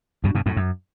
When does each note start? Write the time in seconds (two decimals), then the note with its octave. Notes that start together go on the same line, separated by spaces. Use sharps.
0.24 G2 B2
0.35 G2 B2
0.46 F#2 A2
0.57 F#2